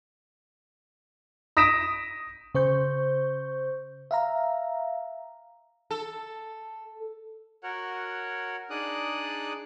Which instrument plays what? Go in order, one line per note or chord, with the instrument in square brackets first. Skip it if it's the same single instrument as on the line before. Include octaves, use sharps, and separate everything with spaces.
[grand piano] D#6 A#6 B6 D7 E7
[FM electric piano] C#3 C5 C#6 G6
E5 F5 A#5
[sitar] A4
[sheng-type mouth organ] F#4 A#4 C#5 F#5
D4 D#4 G#4 D5 D#6 F#6